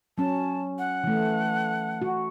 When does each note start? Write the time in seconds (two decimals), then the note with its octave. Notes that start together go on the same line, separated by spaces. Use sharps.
0.18 F#3 C#4 A5
0.79 F#5
1.04 E3 A3
2.02 F#4